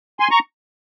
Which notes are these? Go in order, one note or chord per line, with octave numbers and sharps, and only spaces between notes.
G#5 C6
A#5 C#6